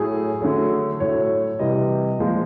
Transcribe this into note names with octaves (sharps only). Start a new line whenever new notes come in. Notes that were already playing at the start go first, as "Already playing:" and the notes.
Already playing: A2 F#3 A3 G#4
D3 F#3 A3
A2 F#3 A3 C#5
C3 E3 G3 D#5
A#2 F3 G#3